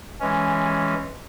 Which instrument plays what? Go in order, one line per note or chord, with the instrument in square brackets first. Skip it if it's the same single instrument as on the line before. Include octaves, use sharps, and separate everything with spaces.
[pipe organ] E3 G#3 C#4